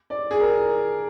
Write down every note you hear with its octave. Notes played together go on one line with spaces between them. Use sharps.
D5
G#4
A#4